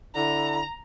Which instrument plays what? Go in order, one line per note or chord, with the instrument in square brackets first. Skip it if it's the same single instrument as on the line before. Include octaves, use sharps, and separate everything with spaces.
[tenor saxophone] D3 [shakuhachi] E4 [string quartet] A#5